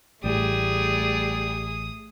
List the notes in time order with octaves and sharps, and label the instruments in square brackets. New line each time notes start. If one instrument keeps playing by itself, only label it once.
[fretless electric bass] A1 A2 [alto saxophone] G3 [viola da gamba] A3 G#4 [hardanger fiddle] D#6